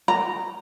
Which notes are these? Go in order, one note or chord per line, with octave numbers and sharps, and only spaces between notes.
A#5